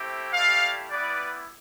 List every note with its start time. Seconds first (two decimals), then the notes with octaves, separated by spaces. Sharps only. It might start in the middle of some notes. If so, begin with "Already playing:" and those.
Already playing: A3 C4 E4 G4
0.34 A3 E4 G4 D5 F5
0.90 G3 B3 E4 B4 D5